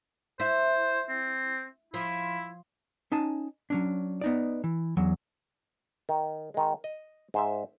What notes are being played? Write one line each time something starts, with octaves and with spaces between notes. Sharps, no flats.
E4 C5
C4
F3 E4
C#4 D#4 G#5 A5
F#3 C#4 D4
B3 D#4 D5
E3
E2 F#3
D#3
D#3 G#3
D#5
G#2 C5 E5